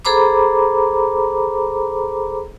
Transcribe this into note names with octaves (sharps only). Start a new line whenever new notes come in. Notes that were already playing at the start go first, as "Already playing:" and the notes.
G#4 A4 C5 A#5 B5 D6